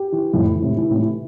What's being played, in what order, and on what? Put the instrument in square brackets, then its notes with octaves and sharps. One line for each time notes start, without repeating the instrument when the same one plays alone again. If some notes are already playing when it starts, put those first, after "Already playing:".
Already playing: [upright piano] G4
E3
[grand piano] F2 A2 [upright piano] E3
[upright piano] E3
[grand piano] A2 C3
[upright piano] E3
[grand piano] A2 C3
[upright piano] E3